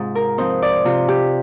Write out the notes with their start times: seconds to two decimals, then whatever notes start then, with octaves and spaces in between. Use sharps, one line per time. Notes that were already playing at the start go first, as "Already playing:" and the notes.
Already playing: G#2 C3 C4 F4
0.15 A#4
0.38 F3 C4 D#4 C5
0.62 D5
0.85 C3 F4
1.08 G4